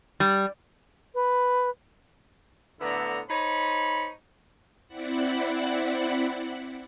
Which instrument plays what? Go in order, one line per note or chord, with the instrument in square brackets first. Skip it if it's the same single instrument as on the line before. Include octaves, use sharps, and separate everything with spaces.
[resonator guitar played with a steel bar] G3
[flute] B4
[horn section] A2 D3 B3 D4 E4 A#5
D#4 C5 C#5 B5
[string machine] C4 E4 D5 F#5 B5